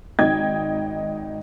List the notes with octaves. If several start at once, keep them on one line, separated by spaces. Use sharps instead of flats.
G#1 D#4 G5 G#6